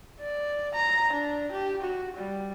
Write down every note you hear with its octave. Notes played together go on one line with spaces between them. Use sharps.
D5
A#5
D4
G4
F#4
G3